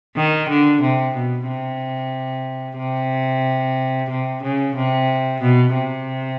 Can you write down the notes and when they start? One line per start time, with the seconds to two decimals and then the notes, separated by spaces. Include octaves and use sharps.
0.16 D#3
0.49 D3
0.81 C3
1.15 B2
1.48 C3
2.78 C3
4.10 C3
4.43 C#3
4.76 C3
5.41 B2
5.74 C3